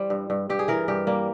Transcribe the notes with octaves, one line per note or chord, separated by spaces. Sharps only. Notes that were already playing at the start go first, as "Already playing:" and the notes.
Already playing: E3 G3 C5
G2
G2
G2 G4
G#4
E3 A#4
G2 G4
G3 A#3